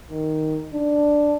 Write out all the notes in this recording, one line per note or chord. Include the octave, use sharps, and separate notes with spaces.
D#3
D4